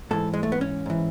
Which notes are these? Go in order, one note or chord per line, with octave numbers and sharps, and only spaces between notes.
G#2 E3 A4
G#3
A3
B3
C#4
G#2 E3